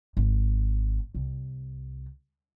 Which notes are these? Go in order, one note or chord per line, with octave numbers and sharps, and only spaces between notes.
G#1
C2